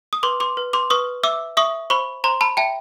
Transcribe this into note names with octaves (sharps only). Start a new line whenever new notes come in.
D#6
B4 C6 D6
C6 D6
B4
C6 D6
B4 C#6 D#6
E5 D6 E6
E5 C#6 D#6
C5 B5 C#6
C5 A#5 C6
A5 B5
E5 G5 A5